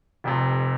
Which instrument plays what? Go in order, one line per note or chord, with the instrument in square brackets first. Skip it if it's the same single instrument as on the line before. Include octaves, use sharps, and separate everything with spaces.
[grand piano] F1 F2 C3